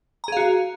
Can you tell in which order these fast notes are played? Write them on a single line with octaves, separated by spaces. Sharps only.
A#5 G#4 F5 F#4